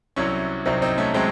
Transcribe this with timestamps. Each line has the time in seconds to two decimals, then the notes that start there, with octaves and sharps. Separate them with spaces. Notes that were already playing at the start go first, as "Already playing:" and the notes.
0.16 C2 C3 F#3 C#4 E4
0.65 C2 C3 F#3 C4 D#4
0.82 C4 D#4
0.98 A3 C#4
1.14 C3 F#3 G#3 C4